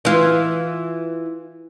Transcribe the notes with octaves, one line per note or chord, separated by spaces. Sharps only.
E3 F4